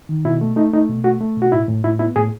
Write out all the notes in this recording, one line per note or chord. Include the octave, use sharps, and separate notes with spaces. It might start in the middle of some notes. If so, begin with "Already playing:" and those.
D#3
B2 E4
A3
A3 D#4
A3 D#4
B2
A3 F#4
A3
B2
F#4
A2 E4
A2
A2 E4
B3 E4
A2 G#4